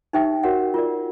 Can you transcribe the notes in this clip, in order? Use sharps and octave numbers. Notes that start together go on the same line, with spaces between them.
D#4 G4 C5 E5 G5
F#4 A#4 C#5 F#5
F4 A#4 D5